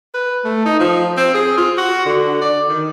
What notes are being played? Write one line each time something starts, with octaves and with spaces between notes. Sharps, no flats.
B4
A3
D#4
F3
C4
G#4
F4
F#4
D3
D5
D#3